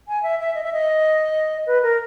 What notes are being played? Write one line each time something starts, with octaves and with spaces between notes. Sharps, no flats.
G#5
E5
E5
D#5
E5
D#5
B4
A#4